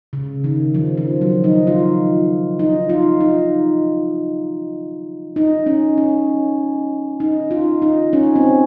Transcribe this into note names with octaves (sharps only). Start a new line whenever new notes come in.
C#3
D#3
F3
F3
F#3
D#4
F4
D#4
F4
D#4
D#4
C#4
C#4
D#4
F4
D#4
C#4
C4